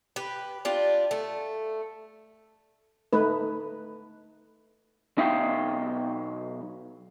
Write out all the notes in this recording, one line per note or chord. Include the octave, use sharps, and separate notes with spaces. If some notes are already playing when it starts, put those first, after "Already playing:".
G4 B4
D4 F4 G4
A3
A3 D#4 B4
B1 D#4 E5 F5 G5